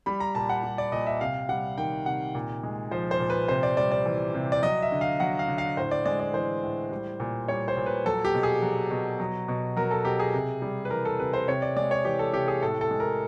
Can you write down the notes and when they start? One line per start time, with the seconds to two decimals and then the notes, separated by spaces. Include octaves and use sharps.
0.06 G3 B5
0.20 A#5
0.35 A#2 A5
0.49 F#5
0.63 G3
0.78 D5
0.92 A#2 D#5
1.07 E5
1.21 C3 F5
1.49 G3 F#5
1.78 D#3 G5
2.06 C3 F#5
2.35 A#2
2.63 G#3
2.91 F3 C5
3.11 C5
3.20 A#2
3.30 B4
3.48 C3 C5
3.63 D5
3.77 G3 D5
3.91 D5
4.06 E3
4.34 C3
4.52 D5
4.63 F#3 D#5
4.83 E5
4.92 D3
5.01 F5
5.20 F#3 F#5
5.39 F5
5.48 D3
5.58 F5
5.77 A2 C5
5.91 D5
6.06 G#3 D5
6.20 D5
6.34 E3 C5
6.63 A2
6.91 G3
7.20 A#2
7.48 G3 C#5
7.68 C5
7.77 A#2
7.86 B4
8.05 F#3 A4
8.25 G4
8.34 B2
8.43 G#4
8.62 F#3
8.91 B2
9.20 F#3
9.48 B2
9.77 F#3 A#4
9.91 A4
10.05 B2 G4
10.19 G#4
10.34 C3
10.62 G3
10.85 B4
10.91 E3 A#4
11.05 A4
11.19 C3 B4
11.33 C5
11.48 C3 C#5
11.62 D5
11.76 G#3 D5
11.91 C#5
12.05 E3 G4
12.19 A4
12.34 C3 G4
12.48 G#4
12.62 A2 A4
12.81 A4
12.91 G#3
13.00 A#4